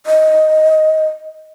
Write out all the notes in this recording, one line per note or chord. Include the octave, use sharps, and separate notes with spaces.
D#5